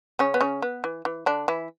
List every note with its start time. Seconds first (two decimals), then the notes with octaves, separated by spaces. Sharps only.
0.19 C#3 C#4
0.34 B3
0.41 C#3 C#4
0.62 B3
0.84 E3
1.05 E3
1.26 D3 D4
1.48 E3 E4